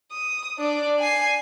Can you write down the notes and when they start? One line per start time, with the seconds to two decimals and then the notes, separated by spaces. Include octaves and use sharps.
0.12 D#6
0.58 D4 D5
1.00 G#5 C7